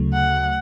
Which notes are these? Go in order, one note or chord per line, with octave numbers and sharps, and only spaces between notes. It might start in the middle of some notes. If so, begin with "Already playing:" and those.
Already playing: D2 C#3 F#3 A3
F#5